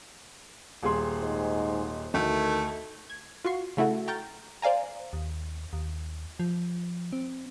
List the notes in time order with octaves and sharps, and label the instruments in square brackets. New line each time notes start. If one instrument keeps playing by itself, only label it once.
[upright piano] D#1 G#4 C6
[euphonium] G#2
[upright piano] D2 [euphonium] D#3 [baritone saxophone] A3
[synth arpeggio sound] G#6
F4 F#4 C#6 C7
C#3 A3 E4 F#4 A4
G5 A#5 C#6 F6 G6 A6
C5 D5 F5 G#5 A#5
[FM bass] D#2
D#2
F3
C4